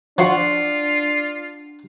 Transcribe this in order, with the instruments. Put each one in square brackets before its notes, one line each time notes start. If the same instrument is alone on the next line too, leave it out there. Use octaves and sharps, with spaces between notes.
[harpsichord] F3 [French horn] D4 [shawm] F4 [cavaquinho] F#5 C6 C#6